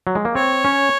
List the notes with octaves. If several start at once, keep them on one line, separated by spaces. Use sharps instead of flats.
F#3
G#3
A#3
C4 C#5
C#4